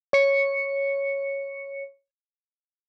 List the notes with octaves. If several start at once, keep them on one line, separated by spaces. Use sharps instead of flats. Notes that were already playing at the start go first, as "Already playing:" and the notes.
C#5 C#7